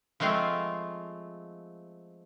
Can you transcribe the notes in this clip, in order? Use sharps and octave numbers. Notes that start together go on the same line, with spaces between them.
F3 G#3 A3 C4 F4